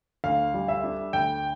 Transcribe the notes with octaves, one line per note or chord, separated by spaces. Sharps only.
D2 F5
G3
E5
D4
D2 G5